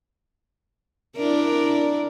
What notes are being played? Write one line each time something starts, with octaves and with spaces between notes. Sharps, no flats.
D4 E4 A#4